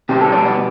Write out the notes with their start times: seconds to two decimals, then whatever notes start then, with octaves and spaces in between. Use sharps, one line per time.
0.09 B2 G3 G4
0.21 A4
0.32 D5
0.45 B3